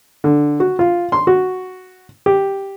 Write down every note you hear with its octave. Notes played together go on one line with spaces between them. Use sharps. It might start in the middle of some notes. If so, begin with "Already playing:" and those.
D3
F#4
F4
C6
F#4
G4